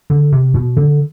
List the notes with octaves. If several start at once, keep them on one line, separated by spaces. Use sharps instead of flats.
D3
C3
B2
D3